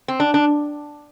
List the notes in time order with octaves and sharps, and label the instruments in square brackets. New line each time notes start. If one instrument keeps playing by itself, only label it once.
[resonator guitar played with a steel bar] C4
D4
D4